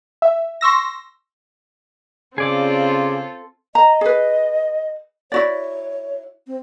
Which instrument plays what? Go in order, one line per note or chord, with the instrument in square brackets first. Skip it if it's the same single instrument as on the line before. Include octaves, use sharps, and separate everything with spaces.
[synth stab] E5
C6 C#6 E6 A#6
[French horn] C#3 [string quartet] C4 F4 A4 [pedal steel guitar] G#4 D5 D6
[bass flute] D#5 [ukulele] A#5
[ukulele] G#4 B4
[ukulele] E4 F#4 D5 [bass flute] C#5
[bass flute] C4